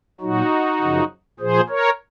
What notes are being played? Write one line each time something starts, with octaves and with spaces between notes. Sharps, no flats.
A#2 F#3 D#4 F#4
F#2 C#3 F3
A#2 F3 G#4 C5
A#4 C#5